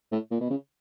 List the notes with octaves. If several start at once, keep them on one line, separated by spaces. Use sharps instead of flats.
A2
A#2
B2
C#3